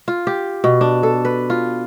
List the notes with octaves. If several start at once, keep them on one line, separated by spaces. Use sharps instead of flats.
F4
G4
B2
D4
A4
B4
F4